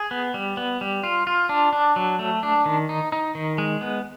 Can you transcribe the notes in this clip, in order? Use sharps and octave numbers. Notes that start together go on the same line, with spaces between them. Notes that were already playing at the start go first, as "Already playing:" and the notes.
Already playing: G#4
B3
G3
B3
G3
F4
F4
D4
D4
F#3
A3
D4
D#3
D#4
D#4
D#3
G#3
B3